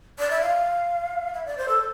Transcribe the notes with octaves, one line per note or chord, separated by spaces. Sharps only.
D5
E5
F5
E5
D5
C5
A4